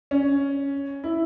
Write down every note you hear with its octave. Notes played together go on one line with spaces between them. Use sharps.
C#4
E4